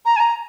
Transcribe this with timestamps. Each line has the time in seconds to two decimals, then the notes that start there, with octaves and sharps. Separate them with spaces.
0.05 A#5
0.16 G#5
0.20 A#5